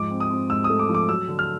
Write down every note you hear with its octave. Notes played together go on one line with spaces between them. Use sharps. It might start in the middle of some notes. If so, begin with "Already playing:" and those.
Already playing: G#2 F3 D6
C4
D#6
C4
G#2 E6
D#6
A3
D6
F3
D6
F#3 E6
D3
F6